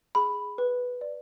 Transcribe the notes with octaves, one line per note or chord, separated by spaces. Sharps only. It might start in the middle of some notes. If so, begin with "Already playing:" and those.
G#4 B5
B4
D5